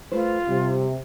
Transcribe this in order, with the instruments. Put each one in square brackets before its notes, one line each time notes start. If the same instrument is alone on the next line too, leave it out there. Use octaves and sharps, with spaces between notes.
[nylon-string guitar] A3 B4 C5 [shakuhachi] F4
[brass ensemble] C3 [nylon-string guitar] G3